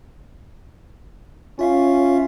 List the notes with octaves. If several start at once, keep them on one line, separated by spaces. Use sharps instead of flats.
C#4 F4 E5 F5